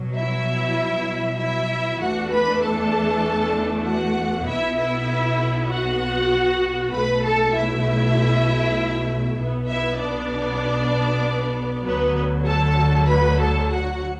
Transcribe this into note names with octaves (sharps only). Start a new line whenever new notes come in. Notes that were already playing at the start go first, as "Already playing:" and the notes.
Already playing: B2 F#3
E4 E5
E4 E5
E2 E3 A3 D4 F#4 F#5
B4 B5
A4 A5
F#4 F#5
B1 B2 B3 E4 E5
E4 E5
F#4 F#5
B1 B2 A3 B4 B5
A4 A5
E4 E5
B1 B2 B3
E4 E5
D4 D5
D2 D3 F#3 B3 B4
A4 A5
B4 B5
A4 A5
F#4 F#5